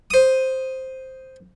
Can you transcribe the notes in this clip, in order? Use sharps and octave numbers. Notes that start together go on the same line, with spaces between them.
C5 D#6